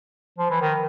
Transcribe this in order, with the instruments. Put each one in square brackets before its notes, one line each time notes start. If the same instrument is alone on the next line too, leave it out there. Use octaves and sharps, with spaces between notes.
[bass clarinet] F3
E3
D#3